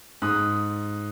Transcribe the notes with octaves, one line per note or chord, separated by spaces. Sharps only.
G#2 D#6 F#6